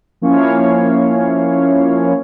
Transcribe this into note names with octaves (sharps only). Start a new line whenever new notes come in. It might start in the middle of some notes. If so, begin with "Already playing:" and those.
F3 A#3 C#4 E4 C#5 F5